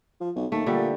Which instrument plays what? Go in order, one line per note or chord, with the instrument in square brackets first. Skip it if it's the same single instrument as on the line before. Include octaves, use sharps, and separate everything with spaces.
[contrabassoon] F3
B1
[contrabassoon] D#2 [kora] A3
[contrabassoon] A#2 [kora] D3 G3